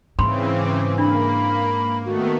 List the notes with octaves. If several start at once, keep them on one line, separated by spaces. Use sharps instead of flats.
G#2 C#3 E3 C4 B5 C6
D6
A#3 D4 B5
D#3 A3 B3 F#4